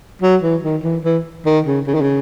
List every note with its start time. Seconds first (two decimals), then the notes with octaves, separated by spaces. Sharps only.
0.22 F#3
0.42 E3
0.63 D#3
0.83 E3
1.04 E3
1.45 D#3
1.66 C#3
1.87 C#3
1.94 D#3
2.02 C#3